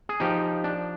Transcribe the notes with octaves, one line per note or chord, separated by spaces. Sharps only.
G#4
F3 D#4 G4
D4